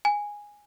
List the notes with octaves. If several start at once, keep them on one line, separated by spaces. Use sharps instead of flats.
G#5